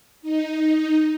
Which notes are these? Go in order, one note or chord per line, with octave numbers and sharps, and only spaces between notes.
D#4